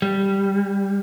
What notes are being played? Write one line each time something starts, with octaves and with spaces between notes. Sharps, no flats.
G3